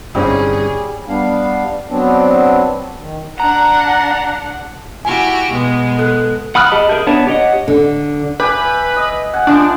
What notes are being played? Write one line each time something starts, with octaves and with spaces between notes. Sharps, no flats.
G1 C2 G2 G3 C4 C#4 G#4 C#5
G3 B3 D4 F5
F#3 B3 C4 D4
D#3
D4 F#5 A#5
E4 F#4 G4 G#5
B2 G#3 B3
A4 F#6
F#5 B5 D#6 F6 F#6
G4 G#4 D#5 A5 B5
G#4 A#4 E5 G6
B3 D4 C#5 A5
G4 C#5 D#5 F#5
D3
G4 B4 E5 G#5
D#5
F#5 G#5
D3 F3 A3 D4